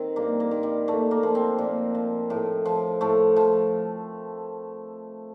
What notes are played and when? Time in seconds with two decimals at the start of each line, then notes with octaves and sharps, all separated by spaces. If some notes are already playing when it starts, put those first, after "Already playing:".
Already playing: D#3 C4
0.16 G2 A#3
0.40 A#3
0.51 D#3
0.63 G3
0.88 A#2 A3
1.11 A#3
1.23 F3
1.35 C4
1.58 A#2
1.95 F3
2.30 A2
2.65 F3
3.01 A2 A3
3.36 F3